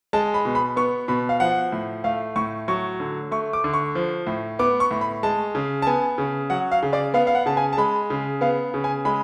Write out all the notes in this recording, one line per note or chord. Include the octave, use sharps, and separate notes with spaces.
G#3 A5
B5
B2
B5
B3 C#6
B2 B5
F5
F3 F#5
A2
A3 F5
A2 C#6
F#3 C#6
D3
A3 C#6
D6
D3
C#6
F3
A2
B3 D6
C#6
A2
B5
G#3 A5
C#3
A5
B3 G#5
C#3
F#3 F#5
F5
C#3
D5
B3 F5
F5
F#5
C#3 A5
G#5
A5
G#3 B5
C#3
B3 F5
C#3
G#5
G#3 B5